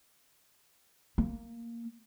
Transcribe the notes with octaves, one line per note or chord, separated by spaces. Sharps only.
A#3